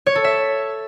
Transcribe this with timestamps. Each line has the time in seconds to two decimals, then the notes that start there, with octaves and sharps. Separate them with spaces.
0.06 C#5
0.15 A4
0.24 E5